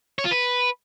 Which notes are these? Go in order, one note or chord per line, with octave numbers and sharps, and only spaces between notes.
C#5
F4
B4